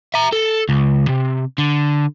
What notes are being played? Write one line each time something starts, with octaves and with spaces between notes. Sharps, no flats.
E5 A#5
A4
C#2
C3
D3